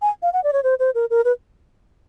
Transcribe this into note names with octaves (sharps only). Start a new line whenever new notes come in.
G#5
F5
F#5
D5
C#5
C5
C5
A#4
A#4
B4